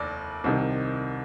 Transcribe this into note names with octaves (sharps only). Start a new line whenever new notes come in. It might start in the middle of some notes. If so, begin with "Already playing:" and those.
Already playing: F1 D#2 D5
C2 C3 D#3